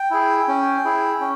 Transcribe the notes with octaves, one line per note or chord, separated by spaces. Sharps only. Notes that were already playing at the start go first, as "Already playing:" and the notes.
Already playing: G5
E4 G#4
C#4
E4 G#4
C#4